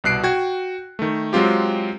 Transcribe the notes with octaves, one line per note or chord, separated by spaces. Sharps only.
C2 B2 F#6 C7 D7
F#4 G5 G#6
D#3 A3
F#3 G#3 C4 F4 G4